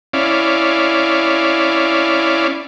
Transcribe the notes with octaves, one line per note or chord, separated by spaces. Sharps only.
C#4 E4 D5 F5